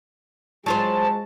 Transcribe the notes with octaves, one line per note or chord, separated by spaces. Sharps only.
F#3 G#3 F4 C5 A5